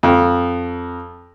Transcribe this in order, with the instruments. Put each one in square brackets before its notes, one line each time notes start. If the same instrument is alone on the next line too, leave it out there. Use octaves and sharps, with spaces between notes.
[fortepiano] F2